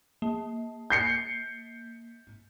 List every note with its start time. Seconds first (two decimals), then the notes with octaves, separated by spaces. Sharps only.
0.22 A#3
0.90 G6 C7 C#7